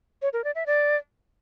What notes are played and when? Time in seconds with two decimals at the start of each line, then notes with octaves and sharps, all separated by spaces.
0.22 C#5
0.33 A#4
0.44 D5
0.55 E5
0.66 D5